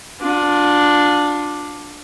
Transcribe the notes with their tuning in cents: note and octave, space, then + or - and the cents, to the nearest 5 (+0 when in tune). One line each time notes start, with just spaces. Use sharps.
D4 +0 F4 +35